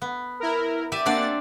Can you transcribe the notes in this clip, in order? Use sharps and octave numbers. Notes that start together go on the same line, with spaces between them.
B3
E4 A#4
G4 D5 E5 D#7
A#3 C4 D4 D5 F#5 A6